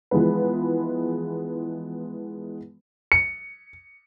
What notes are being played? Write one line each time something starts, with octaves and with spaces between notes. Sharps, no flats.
E3 F3 G#3 B3 B4
C#7